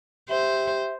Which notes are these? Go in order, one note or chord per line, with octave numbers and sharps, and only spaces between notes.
G4 C5 E5